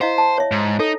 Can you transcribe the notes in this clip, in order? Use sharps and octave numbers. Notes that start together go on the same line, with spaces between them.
E4 C5 D#5 F5
A5
C#5 E5
G#2
D#4 A4